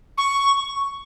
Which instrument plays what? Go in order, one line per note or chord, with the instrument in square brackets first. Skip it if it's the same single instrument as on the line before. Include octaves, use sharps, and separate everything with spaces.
[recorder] C#6